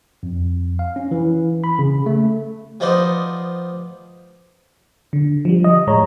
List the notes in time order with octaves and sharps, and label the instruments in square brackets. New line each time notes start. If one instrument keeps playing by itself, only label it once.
[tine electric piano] F2
F5
C#4
E3
B5
C#3
A3
[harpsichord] F3 B3 D#4 C5 D5
[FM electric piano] D3
F3 G3
D#5
A2 G#3 C#5 A#5